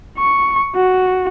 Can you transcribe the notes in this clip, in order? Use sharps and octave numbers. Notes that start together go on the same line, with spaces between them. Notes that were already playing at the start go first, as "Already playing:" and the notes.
C#6
F#4